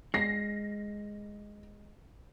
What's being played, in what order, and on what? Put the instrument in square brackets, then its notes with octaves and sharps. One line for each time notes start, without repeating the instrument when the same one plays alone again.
[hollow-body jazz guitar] G#3 [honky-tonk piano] A#6 C7